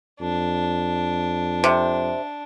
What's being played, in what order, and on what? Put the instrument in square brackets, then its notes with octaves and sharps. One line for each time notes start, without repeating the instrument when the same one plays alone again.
[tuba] F2 [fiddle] D4
[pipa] C3